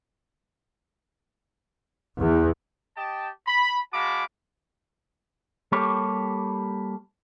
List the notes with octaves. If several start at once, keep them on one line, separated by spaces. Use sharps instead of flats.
E2
G4 D#5 G5 A5
B5
G#3 F#4 F5 A5 B5 D6
G3 A#3 G4 A4 C#5